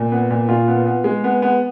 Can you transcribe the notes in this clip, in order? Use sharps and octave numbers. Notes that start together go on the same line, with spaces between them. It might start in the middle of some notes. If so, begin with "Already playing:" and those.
Already playing: A#2
B3
A#2
A#2 F4
B3
B3
G#3
B3
B3